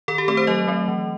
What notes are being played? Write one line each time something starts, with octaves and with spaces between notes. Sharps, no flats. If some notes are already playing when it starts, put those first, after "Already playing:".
D#3 A4
G4
A3 C4 A4
C5
F#3 D#5
A3 C4
E3